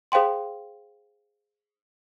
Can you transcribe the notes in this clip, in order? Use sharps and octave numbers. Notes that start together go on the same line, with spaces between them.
G#4 C5 F5 G5 C6